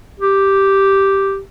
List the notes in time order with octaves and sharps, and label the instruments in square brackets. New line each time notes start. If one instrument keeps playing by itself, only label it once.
[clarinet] G4